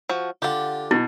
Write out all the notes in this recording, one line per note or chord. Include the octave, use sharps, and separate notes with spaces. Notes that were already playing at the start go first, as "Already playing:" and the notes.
F3 F#4
D3 F4 G4 F#5
B2 E4